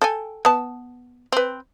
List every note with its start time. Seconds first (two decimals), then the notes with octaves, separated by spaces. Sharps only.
0.02 A4 G5 G#5
0.45 B3 A5
1.32 C4 B4